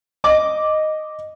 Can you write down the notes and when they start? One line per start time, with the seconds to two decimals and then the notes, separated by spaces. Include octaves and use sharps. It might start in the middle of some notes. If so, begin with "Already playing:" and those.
0.24 D#5 D6